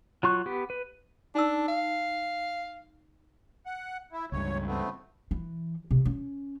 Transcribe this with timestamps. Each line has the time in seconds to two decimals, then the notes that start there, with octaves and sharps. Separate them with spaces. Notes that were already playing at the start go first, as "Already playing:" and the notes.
0.23 F#3 F4 C#6 F#6
0.46 B3 G4
0.70 B4
1.35 D4 D#4 A5 E6
1.68 F5
3.66 F#5
4.12 E4
4.32 C#2 G2 C#5
4.67 A3 B3 C4
5.31 E3
5.91 C3
6.05 C#4